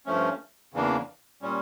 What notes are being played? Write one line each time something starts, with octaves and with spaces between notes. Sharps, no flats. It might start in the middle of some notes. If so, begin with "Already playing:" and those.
G2 F3 A3 C#4
E2 C#3 E3 A#3 D4
A#2 G3 C#4